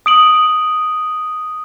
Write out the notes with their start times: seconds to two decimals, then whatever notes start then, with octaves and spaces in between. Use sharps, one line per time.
0.06 D#6 D7 F#7